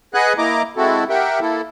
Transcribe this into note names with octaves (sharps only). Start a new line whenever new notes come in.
G#4 B4 D#5 F#5 G#5 F#6
A#3 E4 D#5 A#5 D6
G#3 C4 E4 F#4 A4
G4 A#4 E5 F#5 G5
A#3 E4 A4